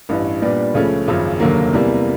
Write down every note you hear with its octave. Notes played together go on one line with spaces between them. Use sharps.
A1 G2 E3
A#2 G3 B3 D4
C#2 C#3 F3 A3 C#4
G#1 F#2 C#3 F3
F1 D#2 D3 F#3 A#3
E2 C3 E3 G3 A#3